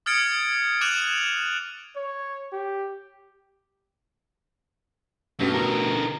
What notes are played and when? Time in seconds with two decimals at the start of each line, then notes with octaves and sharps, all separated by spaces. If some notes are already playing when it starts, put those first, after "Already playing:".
0.06 D#6 F6 G#6 A6 C#7 D7
0.81 D6 F#6 A6 D#7 F7 F#7
1.96 C#5
2.53 G4
5.39 A1 G2 B2
5.54 D3 A#4